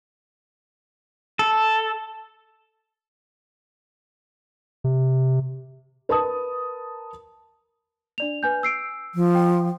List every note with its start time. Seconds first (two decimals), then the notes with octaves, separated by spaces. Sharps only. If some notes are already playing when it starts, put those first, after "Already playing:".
1.39 A4
4.84 C3
6.09 A#4 B4 A5 D#6
8.18 D4 D5 F7
8.43 B4 G#5 G6
8.63 E6 C7 D7
9.15 F3
9.35 G5